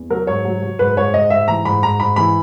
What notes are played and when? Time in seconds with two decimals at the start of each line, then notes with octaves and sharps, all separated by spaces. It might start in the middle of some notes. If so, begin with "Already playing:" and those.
Already playing: E2
0.10 F#3 A#4
0.27 G#2 C#5
0.45 F#3
0.63 F#3
0.79 G#2 B4
0.97 G#2 C#5
1.14 G#2 D#5
1.30 G#2 E5
1.48 E3 A#5
1.65 G#2 B5
1.83 G#2 A#5
2.00 G#2 B5
2.16 E3 B5